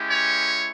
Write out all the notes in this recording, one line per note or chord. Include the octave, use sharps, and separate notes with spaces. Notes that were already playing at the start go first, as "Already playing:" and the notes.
Already playing: G#3 C#4 E4 G4
C#5